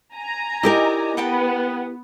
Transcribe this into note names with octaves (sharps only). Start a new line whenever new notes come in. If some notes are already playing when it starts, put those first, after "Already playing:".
G#5 A#5
D#4 E4 G4 A#4 D5 D#5
B3 F#5 G5 A5